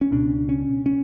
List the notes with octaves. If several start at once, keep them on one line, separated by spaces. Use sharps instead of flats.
C#4
C#2 B2 D4
C#4
C#4